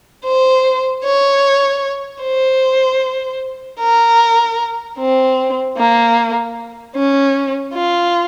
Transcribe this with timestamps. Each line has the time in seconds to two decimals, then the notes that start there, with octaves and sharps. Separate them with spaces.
0.25 C5
1.04 C#5
2.22 C5
3.80 A#4
4.98 C4
5.77 A#3
6.95 C#4
7.74 F4